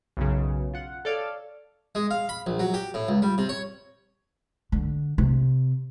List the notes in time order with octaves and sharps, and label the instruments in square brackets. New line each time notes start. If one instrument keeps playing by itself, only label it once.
[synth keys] B1 F#2 C#3
F4 F#5
A4 C#5 D5 F5
[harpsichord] G#3
F5
B5
A#1
F#3
G4
A2
C#2
G3
C3
C#5
[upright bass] D3
C3